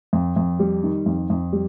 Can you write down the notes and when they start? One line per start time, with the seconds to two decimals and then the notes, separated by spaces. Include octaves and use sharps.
0.13 F2
0.36 F2
0.59 G3
0.83 D#3
1.06 F2
1.30 F2
1.53 G3